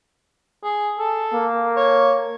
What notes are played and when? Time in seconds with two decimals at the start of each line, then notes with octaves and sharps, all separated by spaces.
0.64 G#4
0.99 A4
1.33 A#3
1.77 C#5